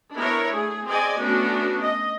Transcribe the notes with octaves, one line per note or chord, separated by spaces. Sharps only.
B3 D4 E4 A#4 C#5
A3 G#4
C4 G#4 D5 D#5 G#5
A3 B3 C#4 D4 F#4
D#5